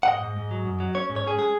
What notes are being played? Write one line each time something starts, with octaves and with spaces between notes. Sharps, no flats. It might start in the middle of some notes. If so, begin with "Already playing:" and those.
F#5
G#2 D#5
G#2
G#2
F#3
F#2
F#3
C#4 C#5
G#2
C#5
C#4 G#4
G#3 G#4